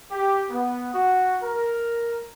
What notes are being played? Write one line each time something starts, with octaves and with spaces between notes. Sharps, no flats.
G4
B3
F#4
A#4